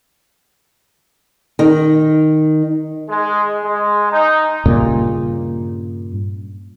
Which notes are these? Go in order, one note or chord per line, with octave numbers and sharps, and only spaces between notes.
D#3
G#3
G#3
D#4
G2 A#2 C#3